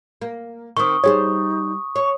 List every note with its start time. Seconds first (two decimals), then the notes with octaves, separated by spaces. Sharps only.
0.22 A#3
0.77 D#3 C4 C#6 D#6
1.04 G3 D#4 F#4 G#4 C5 C#5
1.96 C#5 C#6